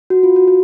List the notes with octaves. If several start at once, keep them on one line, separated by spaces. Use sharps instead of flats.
F#4
F4
F#4
F#4